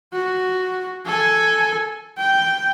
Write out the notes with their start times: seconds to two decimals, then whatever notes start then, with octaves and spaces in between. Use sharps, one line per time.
0.13 F#4
1.06 A4 G#5
2.17 G5